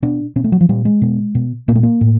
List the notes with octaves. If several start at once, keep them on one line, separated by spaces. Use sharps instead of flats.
B2 D4
B2 C#4
A3
F#3
F3
A#2 G3
G#3
B2
B2
A#2 A#3
A3
A#3
A2